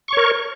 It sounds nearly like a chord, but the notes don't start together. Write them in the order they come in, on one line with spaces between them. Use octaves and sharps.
C#6 C#5 A#4